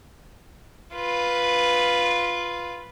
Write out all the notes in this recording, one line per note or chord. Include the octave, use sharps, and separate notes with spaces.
F4 B4